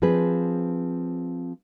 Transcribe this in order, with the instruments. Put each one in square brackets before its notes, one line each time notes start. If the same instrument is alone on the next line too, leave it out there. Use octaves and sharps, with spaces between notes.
[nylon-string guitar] F3 C4 D4 G#4 B4